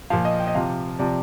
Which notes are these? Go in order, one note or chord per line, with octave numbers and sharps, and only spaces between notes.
A#2 F3 F5
D#5
G5
D#5
C3 F3 F5
C3 F3 D5